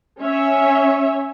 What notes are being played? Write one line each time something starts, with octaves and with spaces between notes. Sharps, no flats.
C#4 C#5 E5